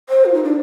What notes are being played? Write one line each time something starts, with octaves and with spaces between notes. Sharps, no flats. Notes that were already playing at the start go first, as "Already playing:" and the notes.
C5
F4
D#4
D4